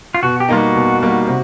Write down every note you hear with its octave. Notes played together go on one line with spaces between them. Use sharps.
F4
B2 F#4
G4
G3 A#3 D#4 F4
F#4
B2
G3 A#3 D#4
C3